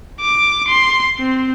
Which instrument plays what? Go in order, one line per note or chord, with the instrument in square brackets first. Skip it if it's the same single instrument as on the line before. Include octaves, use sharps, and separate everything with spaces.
[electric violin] D6
C6
C4